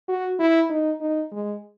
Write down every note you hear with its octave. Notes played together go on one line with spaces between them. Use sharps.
F#4
E4
D#4
D#4
G#3